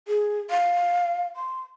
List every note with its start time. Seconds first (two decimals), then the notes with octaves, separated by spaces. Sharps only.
0.08 G#4
0.50 F5
1.36 C6